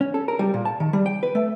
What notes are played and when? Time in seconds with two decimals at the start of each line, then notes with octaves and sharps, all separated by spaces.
0.01 C#4
0.14 A4
0.28 A#4
0.39 G3
0.54 A#2
0.65 A5
0.80 D#3
0.93 G3
1.06 G5
1.23 B4
1.35 A3